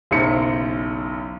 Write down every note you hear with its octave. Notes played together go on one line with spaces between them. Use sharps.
F#1 B1 C5 C#7